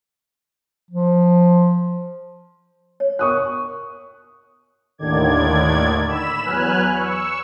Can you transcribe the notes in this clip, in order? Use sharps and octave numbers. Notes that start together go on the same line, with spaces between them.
F3
C#5
A#4 F#5 C#6 D#6 F#6
D#2 A2 D3 D#3 D5 G#6
B5 E6 E7
E2 F#3 B4 G#5 F6 F#6
C#6 E6